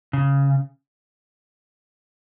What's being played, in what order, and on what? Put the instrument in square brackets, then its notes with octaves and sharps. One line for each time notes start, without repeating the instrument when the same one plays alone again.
[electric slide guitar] C#3